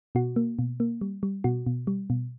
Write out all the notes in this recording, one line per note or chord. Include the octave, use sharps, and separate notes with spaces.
B2 F#4
A#3
B2
A#3
G3
G3
B2 F#4
B2
G3
B2